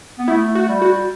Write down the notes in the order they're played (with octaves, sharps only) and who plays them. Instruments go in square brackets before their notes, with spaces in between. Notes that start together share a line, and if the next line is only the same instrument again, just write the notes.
[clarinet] B3
[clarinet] A3 [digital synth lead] E4
[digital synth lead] F#4
[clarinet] G3
[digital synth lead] F#4